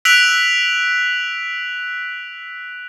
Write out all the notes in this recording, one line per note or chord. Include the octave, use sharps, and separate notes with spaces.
E6 F#6 B6 D7 F7 F#7